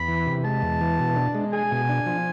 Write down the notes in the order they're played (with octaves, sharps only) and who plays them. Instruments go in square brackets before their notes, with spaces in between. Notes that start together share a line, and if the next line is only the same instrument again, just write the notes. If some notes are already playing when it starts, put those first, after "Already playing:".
Already playing: [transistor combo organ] E2 [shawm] B5
[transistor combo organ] E3
C3
[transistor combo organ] G#3 [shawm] A5
[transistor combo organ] E2
E3
B2
D4
G#3
[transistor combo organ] G#4 [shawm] G#5
[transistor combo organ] B2
D4
F3